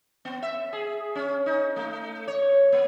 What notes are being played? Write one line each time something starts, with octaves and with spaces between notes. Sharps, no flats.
B3
E5
G#4
C#4
D#4
A3
C#5
A#3